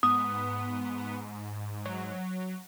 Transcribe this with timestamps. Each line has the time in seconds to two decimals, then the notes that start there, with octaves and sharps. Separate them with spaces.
0.03 G#2 B3 D#6
1.86 F#3